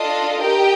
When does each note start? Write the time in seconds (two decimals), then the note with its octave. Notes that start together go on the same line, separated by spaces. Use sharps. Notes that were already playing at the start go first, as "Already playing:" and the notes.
Already playing: D4 F4 A4 D#5
0.41 G4 A#4 D#5 G5